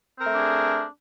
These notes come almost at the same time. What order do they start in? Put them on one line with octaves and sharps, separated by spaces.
C4 A#4 A3 D4 G#4